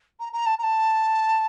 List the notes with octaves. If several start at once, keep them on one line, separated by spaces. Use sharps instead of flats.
A#5
A#5
A5
A#5
A5